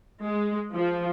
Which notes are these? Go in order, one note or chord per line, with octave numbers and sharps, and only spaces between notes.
G#3
F3